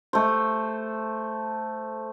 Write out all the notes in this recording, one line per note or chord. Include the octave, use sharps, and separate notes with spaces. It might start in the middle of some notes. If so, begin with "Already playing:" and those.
A3 C5